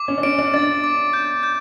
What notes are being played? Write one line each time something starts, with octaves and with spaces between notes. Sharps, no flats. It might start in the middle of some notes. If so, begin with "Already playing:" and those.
Already playing: D6
C#4
D4
C#4 D7
D4
D4 A6
D6
G6
G6